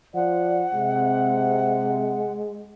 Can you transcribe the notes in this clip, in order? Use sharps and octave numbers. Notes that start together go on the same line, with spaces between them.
F3 D5 F#5
C3 G#3